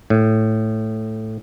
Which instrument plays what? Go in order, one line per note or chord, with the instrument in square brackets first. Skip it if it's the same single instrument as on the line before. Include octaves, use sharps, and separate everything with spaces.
[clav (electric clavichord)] A2